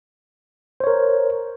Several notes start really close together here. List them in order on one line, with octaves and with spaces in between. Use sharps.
C5 C#5 A#4